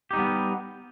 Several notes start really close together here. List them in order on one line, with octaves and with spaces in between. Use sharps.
G4 D#4 G3 B3